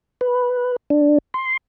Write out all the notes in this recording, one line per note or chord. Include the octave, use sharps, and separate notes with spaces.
B4
D4
C6